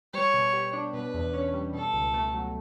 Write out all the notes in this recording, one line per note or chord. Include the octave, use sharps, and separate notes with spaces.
G3 C#5
B2
G4
D4
B2 B4
E2
C#4
G3
B2 A4
C#2
A3
F#3